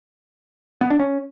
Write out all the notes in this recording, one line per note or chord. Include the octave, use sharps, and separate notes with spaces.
B3
D4
C#4